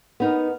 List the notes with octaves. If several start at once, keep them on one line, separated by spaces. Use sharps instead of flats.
B3 D#4 A#4